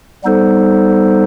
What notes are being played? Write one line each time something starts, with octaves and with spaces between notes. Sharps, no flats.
G3 B3 D#4 A4 C5